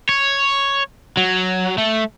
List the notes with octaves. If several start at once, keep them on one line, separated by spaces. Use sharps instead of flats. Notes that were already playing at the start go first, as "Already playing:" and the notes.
C#5
F#3
A3